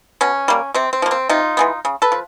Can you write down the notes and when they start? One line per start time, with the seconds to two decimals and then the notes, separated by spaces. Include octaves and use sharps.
0.21 B2 C#4
0.48 G3 A#3
0.74 C3 C4
0.93 C4
1.02 F3 A#3
1.11 C4
1.29 C3 D#4 F4
1.57 E3 G#3 B3
1.85 C#3
2.02 A4 B4
2.12 F3